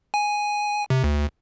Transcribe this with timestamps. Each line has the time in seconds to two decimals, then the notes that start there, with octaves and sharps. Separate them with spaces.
0.14 G#5
0.90 C3
1.04 D2